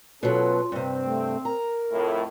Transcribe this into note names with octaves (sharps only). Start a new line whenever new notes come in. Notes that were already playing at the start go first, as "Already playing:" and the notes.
B2 F#3 C#4 F4 A4
G2 C3 C4
A3
A#4 A#5
F2 A2